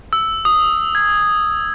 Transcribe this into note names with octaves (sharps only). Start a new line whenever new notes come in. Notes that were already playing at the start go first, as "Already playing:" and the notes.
E6
D#6
G#6